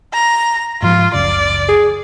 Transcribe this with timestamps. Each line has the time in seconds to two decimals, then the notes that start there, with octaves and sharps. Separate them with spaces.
0.14 A#5
0.82 G#2 F3 F4
1.14 F#1 C#2 C#3 D5
1.68 G#4